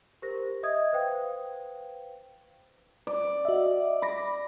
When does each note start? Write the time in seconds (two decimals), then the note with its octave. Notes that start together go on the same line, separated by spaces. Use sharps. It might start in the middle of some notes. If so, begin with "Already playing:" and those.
0.22 G4 A#4 C5 A#6
0.63 D#5 E5 D#6 G#6
0.93 B4 C5 F5 G5
3.07 D5
3.45 F#4 D#5 E5
4.02 B5 D6 A#6